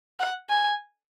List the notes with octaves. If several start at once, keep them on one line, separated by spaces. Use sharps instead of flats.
F#5
G#5